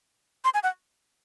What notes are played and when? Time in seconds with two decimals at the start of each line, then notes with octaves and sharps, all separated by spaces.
0.45 C6
0.54 G#5
0.63 F#5